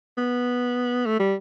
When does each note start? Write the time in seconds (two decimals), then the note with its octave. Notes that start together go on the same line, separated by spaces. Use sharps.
0.18 B3
1.06 A3
1.19 G3